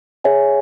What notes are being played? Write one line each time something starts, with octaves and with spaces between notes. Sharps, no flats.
G#4 C#5 E5 G#5